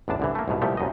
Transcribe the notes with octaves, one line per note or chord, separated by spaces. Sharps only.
A1 E2 D4 A5
C2 D3 E3
A3 A#3
C2 G#2 B2
C2 A#2 F3 A3 G4
C2 F#2 D#5